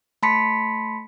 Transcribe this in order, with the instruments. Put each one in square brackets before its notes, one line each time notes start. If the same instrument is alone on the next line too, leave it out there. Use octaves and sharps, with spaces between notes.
[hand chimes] A3 A5 B5 C6 B6 C#7